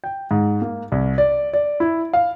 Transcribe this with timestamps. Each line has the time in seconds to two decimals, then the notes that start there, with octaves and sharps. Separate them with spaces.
0.04 G5
0.31 G#2
0.62 A#3
0.92 C2
1.18 D5
1.54 D5
1.80 E4
2.13 F5